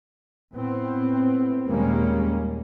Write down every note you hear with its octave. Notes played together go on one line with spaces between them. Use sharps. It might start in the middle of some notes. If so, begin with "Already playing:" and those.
A2 B3 C4
D#2 A#2 G3 G#3 A#3 C#4